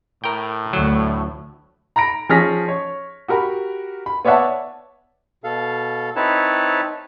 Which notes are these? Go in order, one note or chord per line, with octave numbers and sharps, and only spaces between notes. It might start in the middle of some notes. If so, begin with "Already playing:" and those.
A2 A#4 G5
D2 F#3 A3
A#5 B5 A#6 D7
F3 C#4 G#4 F6 A#6 B6
C#5
F#4 G4 A#4 B5
B5
B3 C#5 D5 E5 F#5 A5
B2 A4 F5
C4 D#4 E4 B4 C#5 A5